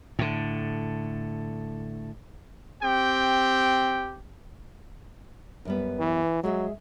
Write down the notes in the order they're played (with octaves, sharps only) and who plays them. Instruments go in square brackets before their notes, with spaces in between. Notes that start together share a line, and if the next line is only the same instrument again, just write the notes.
[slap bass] A2 D3
[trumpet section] C4 G4 G5
[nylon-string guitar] F#2 G3 B3
[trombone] E3
[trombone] F#3 [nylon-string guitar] G#3 G#4 E5